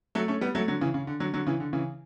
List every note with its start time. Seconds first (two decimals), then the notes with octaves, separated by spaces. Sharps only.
0.15 F#3 A3
0.28 A3 C#4
0.41 G3 B3
0.55 F#3 A3
0.68 D3 F#3
0.81 C#3 E3
0.94 C#3
1.07 D3
1.20 D3 F#3
1.34 D3 F#3
1.47 C#3 E3
1.60 D3
1.73 C#3 E3